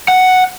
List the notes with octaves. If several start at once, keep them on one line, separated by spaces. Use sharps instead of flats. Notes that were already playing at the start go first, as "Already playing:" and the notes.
F#5